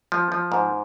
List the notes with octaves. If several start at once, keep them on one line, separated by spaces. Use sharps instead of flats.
F3
F3
G#2